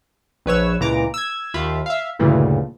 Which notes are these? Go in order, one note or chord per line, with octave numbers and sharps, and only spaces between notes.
A#1 B4 C#5 E6
C#2 A#2 E3 A#5 D6
E6 G#6
D#2 F4 E5 B5
E5 F5
D2 G2 A#2 C#3 E3